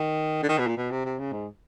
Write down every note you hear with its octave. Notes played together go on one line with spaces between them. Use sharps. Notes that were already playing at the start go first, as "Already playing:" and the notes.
Already playing: D#3
D3
D#3
B2
A#2
B2
C3
C3
C#3
G#2